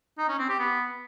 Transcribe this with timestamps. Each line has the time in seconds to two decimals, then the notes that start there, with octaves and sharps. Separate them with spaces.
0.19 D#4
0.29 C#4
0.39 C4
0.49 G4
0.60 B3